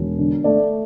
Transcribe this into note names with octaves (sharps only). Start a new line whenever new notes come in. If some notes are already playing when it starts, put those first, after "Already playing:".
Already playing: E1
D3
A3 D5